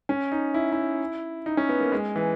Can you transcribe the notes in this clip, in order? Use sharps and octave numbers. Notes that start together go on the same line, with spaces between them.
C#4
D#4
E4
E4
D#4
C#4
B3
A#3
G#3
E3